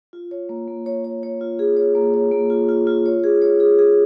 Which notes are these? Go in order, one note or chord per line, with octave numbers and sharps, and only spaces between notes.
F4
C#5
A#3
A#3
C#5
C#5
C#5
F4
G#4
C#5
A#3
C#5
A#3
F4
F4
F4
C#5
G#4
C#5
G#4
G#4